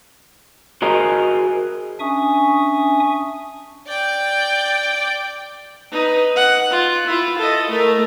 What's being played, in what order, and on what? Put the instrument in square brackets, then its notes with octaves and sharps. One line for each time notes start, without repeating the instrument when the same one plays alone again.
[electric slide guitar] F#4 G#4 A#4 C5 D#5
[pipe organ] C#4 D4 E5 G#5 C#6 D#6
[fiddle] D5 G5
[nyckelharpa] D#4 B4
F#5
F4
E4 F4
A4 D#5
A3 A#4